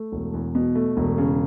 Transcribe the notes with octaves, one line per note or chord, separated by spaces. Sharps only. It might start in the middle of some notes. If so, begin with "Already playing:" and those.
Already playing: A3
E1
E2
B2
A3
E1
C#3